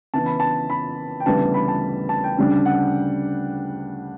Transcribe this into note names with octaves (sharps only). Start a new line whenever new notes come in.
C#3 E3 B3 A5
B5
A5
B5
G5
D2 C#3 E3 G3 B3 A5
B5
A5
A5
G5
D2 C#3 G3 D4
F#5